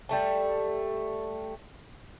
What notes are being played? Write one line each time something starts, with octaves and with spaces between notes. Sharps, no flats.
G3 A3 A5